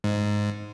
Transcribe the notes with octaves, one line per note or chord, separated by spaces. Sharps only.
G#2